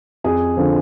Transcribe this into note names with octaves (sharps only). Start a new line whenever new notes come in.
F2 G#4
D3 F3